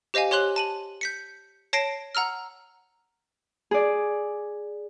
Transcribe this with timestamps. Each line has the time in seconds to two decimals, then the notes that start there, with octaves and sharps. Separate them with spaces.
0.14 G4 C5 D#5 F5 G#5
0.31 G4 C#5 C6 F#6 F#7
0.56 A5 D#7 F#7
1.01 G6 B6 C#7
1.73 C#5 A5 A#6 C7 D7 E7
2.15 F#5 A#5 E6 F6
3.71 G#4 D5